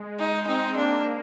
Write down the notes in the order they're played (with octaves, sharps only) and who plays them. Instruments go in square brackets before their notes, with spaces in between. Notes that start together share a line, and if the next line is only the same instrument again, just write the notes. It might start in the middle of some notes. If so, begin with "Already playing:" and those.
Already playing: [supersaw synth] G#3
[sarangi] D#4
[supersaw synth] C4 [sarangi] D#4
[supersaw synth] A#3 [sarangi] D4